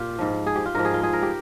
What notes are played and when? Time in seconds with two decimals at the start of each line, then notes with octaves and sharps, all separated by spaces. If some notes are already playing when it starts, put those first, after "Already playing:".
Already playing: A#2 F4 G4
0.18 G#2 F3
0.47 G#4
0.56 G4
0.66 F4
0.75 G#2 F3 A#4
0.85 G#4
0.94 F4
1.03 G#4
1.13 A#4
1.23 G4